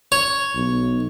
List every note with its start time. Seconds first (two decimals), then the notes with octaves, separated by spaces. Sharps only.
0.12 C#5
0.55 B1